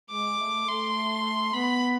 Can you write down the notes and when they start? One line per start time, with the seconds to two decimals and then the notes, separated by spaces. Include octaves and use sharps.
0.11 G#3 D6
0.39 A3
0.68 A3 C6
1.53 B3 B5